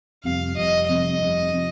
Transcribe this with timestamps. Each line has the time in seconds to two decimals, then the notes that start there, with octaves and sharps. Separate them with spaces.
0.24 F1 F2 C3 G3 F5
0.56 F1 F2 C3 G3 D#5
0.87 F1 F2 C3 G3 D#5
1.20 F1 F2 C3 G3
1.53 C3 F3